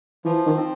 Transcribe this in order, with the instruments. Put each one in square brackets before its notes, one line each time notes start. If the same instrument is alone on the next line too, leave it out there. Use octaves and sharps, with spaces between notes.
[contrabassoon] E3 [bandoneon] F3
[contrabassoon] D#3
[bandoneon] C4